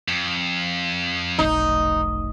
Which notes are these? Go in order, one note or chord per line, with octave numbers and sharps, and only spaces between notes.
F2
F1 B1 D#4